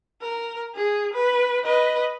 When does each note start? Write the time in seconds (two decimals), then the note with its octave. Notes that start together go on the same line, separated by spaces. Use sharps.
0.21 A#4
0.75 G#4
1.13 B4
1.64 B4 D#5